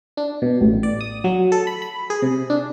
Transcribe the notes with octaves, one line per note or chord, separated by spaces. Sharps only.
D4
B2
A1
D5
D#6
F#3
A4
B5
B5
G#4
C3
D4